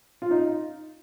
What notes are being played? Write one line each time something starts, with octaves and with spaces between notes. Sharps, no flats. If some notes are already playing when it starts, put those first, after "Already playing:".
F4
D#4